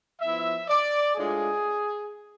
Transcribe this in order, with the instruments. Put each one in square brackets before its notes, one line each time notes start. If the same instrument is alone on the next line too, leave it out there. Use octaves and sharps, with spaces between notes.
[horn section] F3 B3 E4 E5
D5
A2 G#3 D4 F4 G#4